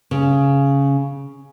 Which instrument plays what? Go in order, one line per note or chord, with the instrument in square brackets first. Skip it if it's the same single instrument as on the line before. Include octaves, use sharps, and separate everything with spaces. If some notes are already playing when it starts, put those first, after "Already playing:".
[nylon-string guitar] C#3